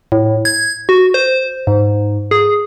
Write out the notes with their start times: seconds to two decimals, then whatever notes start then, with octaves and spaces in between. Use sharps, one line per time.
0.12 A2
0.45 G#6
0.89 F#4
1.14 C5
1.67 G#2
2.31 G#4